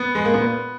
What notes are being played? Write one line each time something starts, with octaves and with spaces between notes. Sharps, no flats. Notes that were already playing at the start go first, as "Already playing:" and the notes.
Already playing: B3
G#3
A#3
A#2 B3